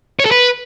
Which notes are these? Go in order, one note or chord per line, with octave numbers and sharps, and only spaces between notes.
C#5
A4
B4